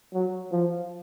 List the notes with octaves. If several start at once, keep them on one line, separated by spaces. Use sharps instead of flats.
F#3
F3